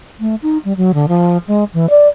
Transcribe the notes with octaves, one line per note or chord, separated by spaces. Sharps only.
A3
D#4
G3
F#3
D3
F3
G#3
E3
D5